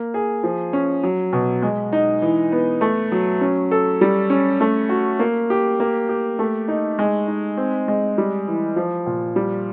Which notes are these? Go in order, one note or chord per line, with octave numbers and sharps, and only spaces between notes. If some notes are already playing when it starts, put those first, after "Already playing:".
Already playing: A#3
G#4
F3
C#4
F#3
B2
G#3
D#4
E3
B3
A3
F#3
C#4
A4
G3
C#4
A3
F#4
A#3
G4
A#3
G4
A3
D#4
G#3
D#4
C4
G#3
G3
E3
F3
A#2
G3